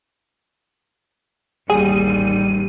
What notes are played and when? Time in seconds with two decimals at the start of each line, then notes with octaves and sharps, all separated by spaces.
1.70 A1 D#2 G3 G#4 D#7